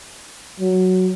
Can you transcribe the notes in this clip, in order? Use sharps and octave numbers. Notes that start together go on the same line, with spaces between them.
F#3